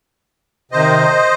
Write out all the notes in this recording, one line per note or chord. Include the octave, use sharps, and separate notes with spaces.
C3 D#3 C5 D#5